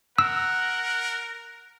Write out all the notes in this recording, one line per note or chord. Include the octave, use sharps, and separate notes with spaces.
A#4 F#5 E6